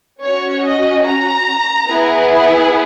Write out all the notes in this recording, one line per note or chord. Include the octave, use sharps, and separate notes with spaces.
C#4 F#4 C#5
D#5
A#5
B3 E4 G#4